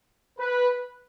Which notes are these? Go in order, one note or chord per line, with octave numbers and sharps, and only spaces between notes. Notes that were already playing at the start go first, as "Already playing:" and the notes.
B4